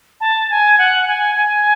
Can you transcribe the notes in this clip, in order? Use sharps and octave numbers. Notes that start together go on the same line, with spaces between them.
A5
G#5
F#5
G#5
G#5